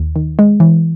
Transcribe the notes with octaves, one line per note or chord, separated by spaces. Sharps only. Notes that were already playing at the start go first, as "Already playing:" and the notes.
Already playing: D#2
D#3
G#3
E3